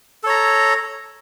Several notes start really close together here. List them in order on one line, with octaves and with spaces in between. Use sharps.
A4 C#5 A#5